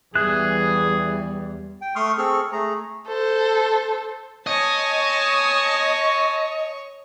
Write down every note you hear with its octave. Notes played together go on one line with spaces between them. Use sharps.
E2 E3 G3 G#4 F#6
G5
A3 C6 C#6 D#6 F6
C4 G#4 A4 C#6 F6
A3 G#4 A#5
A4 C5
C#5 D#5 G#5 A5 C#6